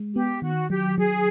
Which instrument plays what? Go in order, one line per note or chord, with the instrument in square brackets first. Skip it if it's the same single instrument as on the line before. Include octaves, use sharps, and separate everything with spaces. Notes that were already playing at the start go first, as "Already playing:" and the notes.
Already playing: [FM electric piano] G#3
[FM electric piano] B3 [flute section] G4
[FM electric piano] D#3 [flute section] F#4
[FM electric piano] F#3 [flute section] G4
[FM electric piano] F#3 [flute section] G#4